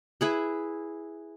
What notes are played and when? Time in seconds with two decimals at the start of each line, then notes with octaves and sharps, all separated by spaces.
0.21 E4 G#4 B4